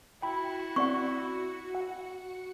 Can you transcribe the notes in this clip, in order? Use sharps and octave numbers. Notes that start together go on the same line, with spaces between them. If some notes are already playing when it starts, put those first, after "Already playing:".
E4 F#4 G5 B5 C#7
C4 D5 F#5 C#6
F#5